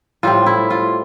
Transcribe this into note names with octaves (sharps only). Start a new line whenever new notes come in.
A2 G3 C4 F4
E4
F4